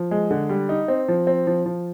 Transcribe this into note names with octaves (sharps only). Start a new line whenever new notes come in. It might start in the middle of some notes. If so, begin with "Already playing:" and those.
Already playing: F3
G#3
D3
G3
D#4
C4
F3
C4
F3
F3